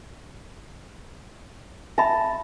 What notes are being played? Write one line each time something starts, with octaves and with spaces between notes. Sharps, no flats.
E5 A5 B5